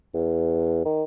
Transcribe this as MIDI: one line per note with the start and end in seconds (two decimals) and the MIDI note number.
0.14 0.81 40
0.85 1.04 51